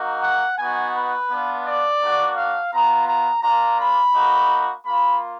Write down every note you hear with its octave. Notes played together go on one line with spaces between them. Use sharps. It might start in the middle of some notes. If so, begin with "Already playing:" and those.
Already playing: A#3 D#4 F#4
F#5
B3 D#4 F#4 G#5
B4
B3 D4 F4
D5
A#3 D4 F#4
F5
B3 F4 A#5
A#5
A#3 D4 F4 A#5
B5
A#3 D#4 F#4
A#3 F4 B5